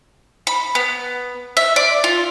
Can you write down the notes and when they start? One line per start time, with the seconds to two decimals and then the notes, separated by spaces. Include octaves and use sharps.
0.47 B5
0.75 B3
1.57 E5
1.76 D5
2.04 F4